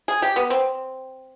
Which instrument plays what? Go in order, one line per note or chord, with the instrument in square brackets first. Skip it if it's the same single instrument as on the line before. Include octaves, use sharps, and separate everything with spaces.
[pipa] G#4
G4
B3
C4